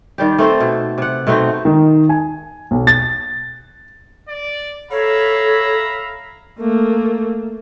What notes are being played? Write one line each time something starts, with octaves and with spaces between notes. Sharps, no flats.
D#3 G3 G4
A3 C4 A4 C5
B2
C3 F#5
B2 A3 C4 D#4
D#3
G#5
B1
A6
D5
A4 C#5 E5 F5 A#5 B5
A3 A#3